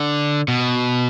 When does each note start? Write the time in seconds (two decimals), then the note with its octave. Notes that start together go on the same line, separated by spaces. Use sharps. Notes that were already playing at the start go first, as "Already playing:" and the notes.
Already playing: D3
0.48 B2